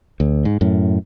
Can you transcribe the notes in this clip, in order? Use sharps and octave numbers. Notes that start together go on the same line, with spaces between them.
D2
G#2
F#2 A2